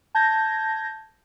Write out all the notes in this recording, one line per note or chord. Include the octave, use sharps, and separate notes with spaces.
A5 G6 G#6 A#6